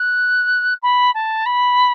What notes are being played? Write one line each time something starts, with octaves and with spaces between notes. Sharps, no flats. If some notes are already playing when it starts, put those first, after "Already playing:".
Already playing: F#6
B5
A5
B5